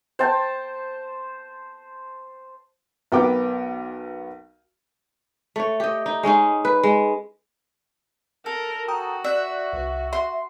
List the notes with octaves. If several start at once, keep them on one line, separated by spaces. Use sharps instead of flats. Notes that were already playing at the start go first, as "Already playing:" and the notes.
C5 G5 A5
B1 B3 A#4 G5 D6
A3 C#5
G4 D#5
D#4
G#3 C#4 D#4 G#4
B4
G#3
A4 A#4
F#4 G5 A#5 D#6
D5 E5 F#6
C2
E5 C6